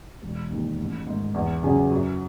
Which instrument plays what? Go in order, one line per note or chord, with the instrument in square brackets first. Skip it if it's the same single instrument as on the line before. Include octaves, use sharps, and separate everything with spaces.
[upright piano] E1
D#2 D#3
A1
G#2 D#3
E2
C#3 F#3 C#4 G#4
F#2